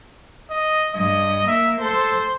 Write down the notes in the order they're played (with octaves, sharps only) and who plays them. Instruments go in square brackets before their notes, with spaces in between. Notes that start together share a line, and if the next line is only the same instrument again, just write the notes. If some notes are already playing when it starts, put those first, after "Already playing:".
[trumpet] D#5
[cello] G2 [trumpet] D#5
[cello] A#3 [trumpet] E5
[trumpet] A4 [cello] C5